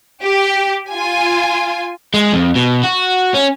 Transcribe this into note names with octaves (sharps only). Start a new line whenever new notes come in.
G4
F4 G#5
G#3
F2
B2
F#4
C#4